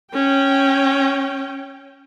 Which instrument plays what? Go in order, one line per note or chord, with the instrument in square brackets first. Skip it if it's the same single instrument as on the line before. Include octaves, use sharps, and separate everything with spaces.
[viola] C#4 G5